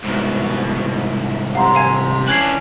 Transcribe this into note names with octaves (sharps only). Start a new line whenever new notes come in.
C2 G#2 B2
C3 F5 F#5 A#5 C6
F5 G#5 G#6
E3 C#4 D4 F#6 G#6 C7 F#7